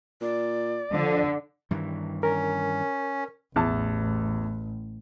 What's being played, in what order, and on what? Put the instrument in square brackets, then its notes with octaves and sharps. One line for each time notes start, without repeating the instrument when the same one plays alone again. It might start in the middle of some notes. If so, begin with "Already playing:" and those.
[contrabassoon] A#2 [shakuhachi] D5
[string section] D3 [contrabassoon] F3
[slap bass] G2 D#3 E3
[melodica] C#4 [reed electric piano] A#4
[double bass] A1 [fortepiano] E2 A5